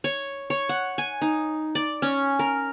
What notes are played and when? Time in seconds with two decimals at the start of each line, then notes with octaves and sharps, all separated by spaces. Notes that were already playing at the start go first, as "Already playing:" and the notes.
0.04 C#5
0.50 C#5
0.69 F#5
0.98 G#5
1.21 D#4
1.75 D5
2.02 C#4
2.39 A#4